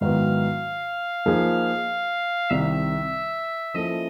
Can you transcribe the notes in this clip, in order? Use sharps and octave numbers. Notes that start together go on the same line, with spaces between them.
G#2 D#3 F#3 B3 E4 F5
F3 A#3 D#4 G#4
C2 C3 D#3 E5
F3 A#3 C#4 E4 A4 D#5